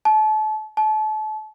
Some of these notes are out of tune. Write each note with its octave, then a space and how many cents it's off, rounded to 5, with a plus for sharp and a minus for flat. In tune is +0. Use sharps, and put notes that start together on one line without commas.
A5 -35
A5 -35